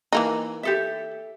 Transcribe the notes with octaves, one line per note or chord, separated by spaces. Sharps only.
E3 A#3 D#4
G4 A4 E5